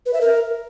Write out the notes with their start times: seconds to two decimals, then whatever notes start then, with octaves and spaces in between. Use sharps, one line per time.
0.06 B4
0.13 E5
0.21 A#4